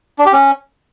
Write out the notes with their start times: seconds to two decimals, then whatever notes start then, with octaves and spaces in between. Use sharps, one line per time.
0.19 D4
0.26 G4
0.33 C#4